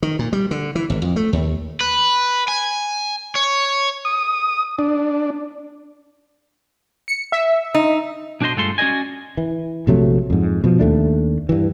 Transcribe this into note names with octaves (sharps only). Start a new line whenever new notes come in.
D#3
A#2
G3
D3
E3
G#1
F2
A3
D#2
B4
G#5
C#5
D#6
D4
C#7
E5
D#4
B1 D4 F#4 C5 D#5 C6
G2 G#3 A3 F4 A4 C6
C#4 F#4 B4 D5 D#5 G#5
E3
A#1 C3 F#3 A3
F2 G#2
B2 F3
D#2 A3 D4
G2 E3